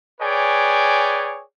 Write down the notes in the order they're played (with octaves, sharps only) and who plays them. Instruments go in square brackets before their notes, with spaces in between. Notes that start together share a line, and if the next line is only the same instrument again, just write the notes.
[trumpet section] G#4 B4 C#5 D5 G5 G#5